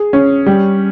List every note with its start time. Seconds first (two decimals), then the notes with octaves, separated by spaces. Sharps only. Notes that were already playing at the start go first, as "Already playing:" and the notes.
Already playing: G#4
0.13 C#4
0.46 G3